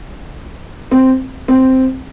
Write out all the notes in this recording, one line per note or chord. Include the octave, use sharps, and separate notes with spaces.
C4
C4